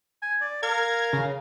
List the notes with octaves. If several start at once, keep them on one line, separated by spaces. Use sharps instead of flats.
G#5
D5
A#4 F5 G#6
C#3